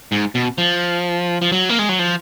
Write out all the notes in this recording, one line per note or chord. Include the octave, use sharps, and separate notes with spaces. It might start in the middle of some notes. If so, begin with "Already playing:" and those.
G#2
B2
F3
F3
F#3
A#3
G#3
F#3
F3